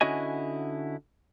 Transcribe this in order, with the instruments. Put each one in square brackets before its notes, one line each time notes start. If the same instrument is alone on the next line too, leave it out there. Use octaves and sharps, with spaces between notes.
[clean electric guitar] D3 C#4 E4 F#4 D#5 G#5